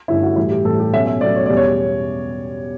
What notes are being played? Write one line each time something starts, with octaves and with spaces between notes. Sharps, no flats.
G2 D3 A3 C#4 E4
F#4
A2 E3 G3 E4
G4
A2 E3 G3 A4
G4
B2 F#3 A3 C#4 E5
E5
B2 F#3 A3 C#4 D5
C#5
E2 B2 G3 C#4 D5
C#5